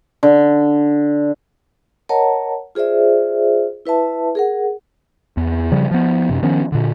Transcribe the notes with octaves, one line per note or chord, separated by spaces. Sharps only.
D3
A#4 C#5 D#5 F#5 A5 A#5
F4 G#4 C5 D5 E5
E4 B4 E5 A5
G#4 A#4 F#5
E2
C#3 F3 G3
F3 B3
F#2 C3
D#3 F3 B3 C#4
A#2 D3